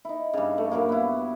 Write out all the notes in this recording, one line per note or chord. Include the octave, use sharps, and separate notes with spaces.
D#4 E4
G2 C#3
A3
G2 A#2 F#3 A#3
B3 E4